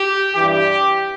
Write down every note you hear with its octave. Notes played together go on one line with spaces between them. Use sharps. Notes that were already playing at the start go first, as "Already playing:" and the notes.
Already playing: G4
G2 E3 G4